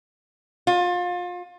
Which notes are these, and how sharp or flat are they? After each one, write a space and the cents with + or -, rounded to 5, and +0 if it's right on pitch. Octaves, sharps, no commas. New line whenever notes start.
F4 +30